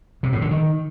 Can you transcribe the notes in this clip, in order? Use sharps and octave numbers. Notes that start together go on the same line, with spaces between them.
C3
A2
D3
D#3